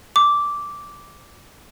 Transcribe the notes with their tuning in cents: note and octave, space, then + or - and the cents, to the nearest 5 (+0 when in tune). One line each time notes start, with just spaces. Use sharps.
D6 -10